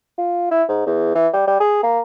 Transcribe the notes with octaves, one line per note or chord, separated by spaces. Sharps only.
F4
E4
G#2
E2
E3
G3
G3
G#4
A#3